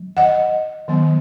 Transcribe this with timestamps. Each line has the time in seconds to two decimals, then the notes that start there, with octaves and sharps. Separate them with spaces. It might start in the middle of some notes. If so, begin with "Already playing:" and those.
Already playing: F#3
0.17 D#5 F#5
0.88 D#3 F#3 B3